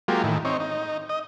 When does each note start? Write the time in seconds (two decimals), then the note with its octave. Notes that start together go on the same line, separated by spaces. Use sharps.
0.08 F#3 G#3 A#3 F4 G4
0.24 A2 D#3 E3
0.45 C4 D#4 C#5
0.60 D#4
1.09 D#5